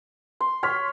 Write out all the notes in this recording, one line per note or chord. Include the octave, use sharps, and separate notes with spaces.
C6
C#5 C6 F6 B6